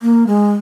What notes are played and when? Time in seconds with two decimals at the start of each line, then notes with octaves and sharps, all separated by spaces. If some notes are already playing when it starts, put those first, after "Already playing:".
0.02 A#3
0.27 G#3